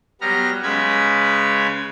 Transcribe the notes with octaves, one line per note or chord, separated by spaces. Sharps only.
F#3 G3 B3 A#5 F6
C#3 G#3 C#4 B4 B5 G#6